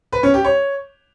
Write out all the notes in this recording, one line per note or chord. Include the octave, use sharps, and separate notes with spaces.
B4
C#4
G4
C#5